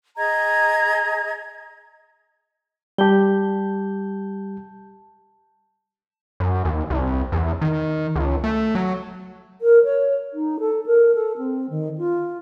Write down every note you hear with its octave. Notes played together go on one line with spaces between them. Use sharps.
G#4 D#5 A#5 G#6
G3 G4 A5 G6 G7
F#2
D#2
C2
E2
D#3
C#2
A3
F#3
A#4
C#5
D#4
A4
A#4
A4
C4
D#3
F4